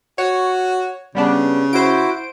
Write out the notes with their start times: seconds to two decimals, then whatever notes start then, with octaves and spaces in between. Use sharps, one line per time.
0.18 F#4 C#5
1.15 C#3 G3 B3 D4
1.73 E4 F#4 C5 D7